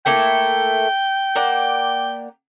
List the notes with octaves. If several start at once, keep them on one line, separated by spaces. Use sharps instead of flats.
A3 A#3 E4 G5
A#3 D5 F#5